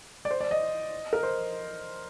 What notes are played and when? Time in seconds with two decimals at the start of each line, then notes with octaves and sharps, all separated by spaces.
0.25 D5
0.31 C5
0.40 D5
0.51 D#5
1.13 A#4
1.23 C5